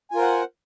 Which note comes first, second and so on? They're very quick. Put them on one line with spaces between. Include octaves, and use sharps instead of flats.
G#5 F4 A#4 C5 F#5